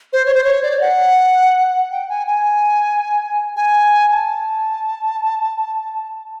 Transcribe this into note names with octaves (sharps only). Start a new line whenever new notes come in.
C5
C#5
C5
C#5
D5
F#5
G5
G#5
G#5
G#5
A5